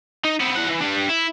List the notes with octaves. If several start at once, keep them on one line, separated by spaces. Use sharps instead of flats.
D#4
B3 C4
E3 F#5
E3
D4 G4
E4